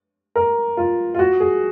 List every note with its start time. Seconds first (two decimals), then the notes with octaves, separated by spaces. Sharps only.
0.36 A#4
0.77 F4
1.15 F4
1.19 F#4
1.40 G#4